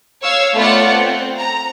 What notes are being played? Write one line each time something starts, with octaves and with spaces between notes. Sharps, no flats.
C#5 F5 E6 G#6
A3 B3 F4 C#5 D5 F#5
C4
A#5